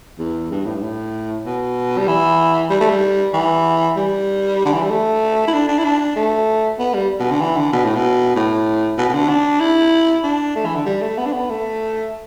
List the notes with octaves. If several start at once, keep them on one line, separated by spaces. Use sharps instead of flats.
E2
G2
A2
G2
A2
B2
G3
E3
G3
A3
G3
E3
G3
D3
E3
G3
A3
E4
D4
D4
E4
D4
A3
B3
G3
B2
D3
E3
D3
B2
A2
B2
A2
B2
B2
D3
D4
E4
D4
A3
E3
D3
G3
A3
B3
D4
B3
A3